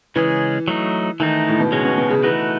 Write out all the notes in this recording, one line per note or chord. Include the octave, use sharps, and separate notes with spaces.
C#3 E3 G#3 C#4 G#4
F#3 A3 D#4
D#3 E3 A3 D#4
A2
B2
C#3 G#3 C#4 F#4 C#5
B2
B2
C#3
E3 A3 D#4 F#4 B4